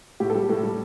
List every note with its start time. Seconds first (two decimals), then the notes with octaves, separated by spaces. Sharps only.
0.20 A2 G4
0.30 A4
0.35 G3 G4
0.49 A2 A4
0.63 G3